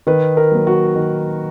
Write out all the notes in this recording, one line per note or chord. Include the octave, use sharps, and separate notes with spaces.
D#3 B4
A#4
F#3 A#3
F#4
D#3